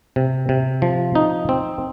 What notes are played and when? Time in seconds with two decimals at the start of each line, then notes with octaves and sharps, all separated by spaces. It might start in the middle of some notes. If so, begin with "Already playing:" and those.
0.16 C3
0.49 C3
0.82 F3
1.15 D#4
1.49 C4